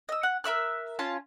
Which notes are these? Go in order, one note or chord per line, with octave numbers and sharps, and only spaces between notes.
D#5 E6
F#5
A#4 E5 E6 F#6
C#4 F4 A5